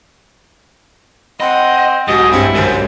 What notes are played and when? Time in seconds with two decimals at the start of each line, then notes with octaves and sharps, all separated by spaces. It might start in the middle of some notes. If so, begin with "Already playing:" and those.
1.40 C4 D#5 F#5 B5 F#6 C#7
2.08 B1 G#2 F#4 G4 D#5
2.32 G2 C4 E4 C#7
2.55 F#1 G#2 D#3 C5